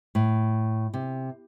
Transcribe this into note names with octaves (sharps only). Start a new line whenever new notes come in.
A2
C3